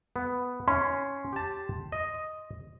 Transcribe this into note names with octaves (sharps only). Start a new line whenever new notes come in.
B3
C#4 C6
G4 A5
D#5